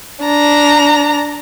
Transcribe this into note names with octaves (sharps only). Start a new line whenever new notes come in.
D4 A#5